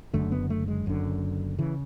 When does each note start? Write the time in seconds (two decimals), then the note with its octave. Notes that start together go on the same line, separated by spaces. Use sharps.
0.13 F#1 F#2 D3 A3
0.32 B3
0.50 A3
0.68 G#3
0.86 F#1 F#2 D3
1.58 C#3 E3